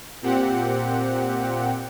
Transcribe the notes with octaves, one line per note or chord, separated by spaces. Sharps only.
A#2 C4 G4 F#5